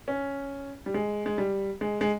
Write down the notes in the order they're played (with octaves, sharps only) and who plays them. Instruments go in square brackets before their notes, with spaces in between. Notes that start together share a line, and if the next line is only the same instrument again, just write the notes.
[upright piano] C#4
G3
G#3
G#3
G3
G#3
G#3